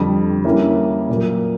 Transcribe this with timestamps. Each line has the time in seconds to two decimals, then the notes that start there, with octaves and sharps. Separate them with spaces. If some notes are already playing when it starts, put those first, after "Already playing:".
Already playing: F2 D3 G3
0.44 E3 G3 A#3 C#4 E4
1.09 A#2 F#3 A#3